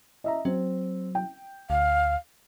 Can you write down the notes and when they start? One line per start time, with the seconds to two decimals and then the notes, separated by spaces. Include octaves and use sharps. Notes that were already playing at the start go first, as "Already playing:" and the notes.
0.24 D#5 E5 A#5
0.45 F#3 C4
1.15 G5
1.70 D2 F5